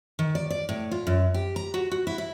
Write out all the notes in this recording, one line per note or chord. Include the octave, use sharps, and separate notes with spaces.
D#3
D5
D5
A2
F4
F#2
G4
A#5
F#4
F#4
E4
E4